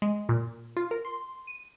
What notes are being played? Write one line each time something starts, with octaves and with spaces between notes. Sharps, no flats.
G#3
A#2
F4
A#4
C6
D#7